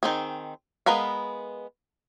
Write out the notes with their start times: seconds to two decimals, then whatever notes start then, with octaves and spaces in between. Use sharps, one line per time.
0.03 D#3 C4 G#4
0.86 G#3 B3 A#4 B4 F5